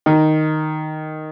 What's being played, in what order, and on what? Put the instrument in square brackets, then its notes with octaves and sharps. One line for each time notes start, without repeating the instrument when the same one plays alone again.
[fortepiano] D#3